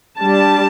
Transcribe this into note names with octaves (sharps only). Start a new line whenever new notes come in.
G3 D4 A5